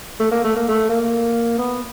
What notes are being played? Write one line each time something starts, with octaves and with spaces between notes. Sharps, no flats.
A3
A#3
A3
A#3
A3
A#3
B3